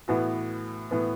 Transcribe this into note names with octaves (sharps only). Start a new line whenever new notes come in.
A2 E3 B3 F#4
A2 E3 B3